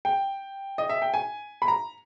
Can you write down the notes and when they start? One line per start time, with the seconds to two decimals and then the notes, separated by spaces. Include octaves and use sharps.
0.05 G5
0.78 D#5
0.89 E5
1.02 G5
1.14 G#5
1.62 B5
1.68 A#5